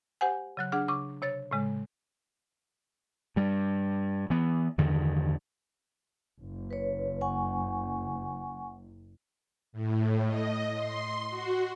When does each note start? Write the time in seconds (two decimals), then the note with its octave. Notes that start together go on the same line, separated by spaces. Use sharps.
0.21 G4 C5 F#5 G#5
0.57 C#3 F#3 F#6
0.72 D4 G#4 F#5 F6
0.88 C#3 C#6 D6
1.22 C3 C#5 A6
1.51 A2 C#3 G#3
3.36 G2 G3
4.30 E3 B3
4.78 E2 G2 D3 D#3
6.39 F#1
6.71 B4 C#5
7.21 F#5 G#5 C#6
9.72 A2
10.26 D#5
10.75 C6
11.29 F#4